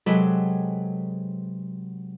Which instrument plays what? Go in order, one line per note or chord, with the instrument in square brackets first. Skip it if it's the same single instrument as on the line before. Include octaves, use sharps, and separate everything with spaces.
[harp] C3 F#3 G#3 G#4 A4 B4